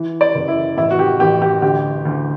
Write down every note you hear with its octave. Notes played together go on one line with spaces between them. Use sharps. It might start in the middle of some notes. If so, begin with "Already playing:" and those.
Already playing: E3
D5
F#1
E4
A1 E4
F#4
G4
A1 G4
G4
D2 G4
D2